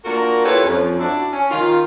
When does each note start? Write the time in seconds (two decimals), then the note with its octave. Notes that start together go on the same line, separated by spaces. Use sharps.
0.05 A#3 D4 F4 F#4 A#4
0.45 E4 F4 G4 A4 B4 C#5
0.63 F2 F3 C#4
0.99 D4 E4 F#4
1.33 C#4
1.51 D#3 F4